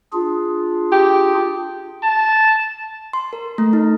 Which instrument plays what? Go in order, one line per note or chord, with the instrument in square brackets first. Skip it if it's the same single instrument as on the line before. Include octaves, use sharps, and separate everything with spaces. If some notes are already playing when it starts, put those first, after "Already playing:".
[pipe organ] D4 F4 G#4
[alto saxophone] G4
[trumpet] A5
[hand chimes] C6
A#4
A3
D#4